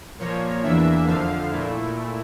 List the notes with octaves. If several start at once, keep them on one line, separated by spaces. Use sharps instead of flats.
A#2 F3 A#3 C#5
E2 E3 A#3 D4 E5
F2 D3 F3 F5
A#2 A3 E4